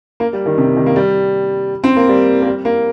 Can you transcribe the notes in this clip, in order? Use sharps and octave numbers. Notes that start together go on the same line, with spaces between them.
A#3
G3
D#3
C3
D#3
A#3
G3
C4
A#3
G3
A#3
G3
A#3